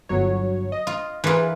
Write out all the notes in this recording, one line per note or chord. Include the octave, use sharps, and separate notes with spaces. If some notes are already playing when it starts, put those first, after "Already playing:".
G1 F#3 C#5
D#5
F4
E3 F4 G#4 A#4 B4